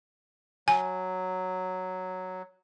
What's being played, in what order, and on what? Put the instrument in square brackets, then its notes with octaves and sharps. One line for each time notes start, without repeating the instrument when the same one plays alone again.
[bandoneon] F#3 [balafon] G#5